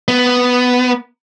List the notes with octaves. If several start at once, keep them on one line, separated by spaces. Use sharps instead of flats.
B3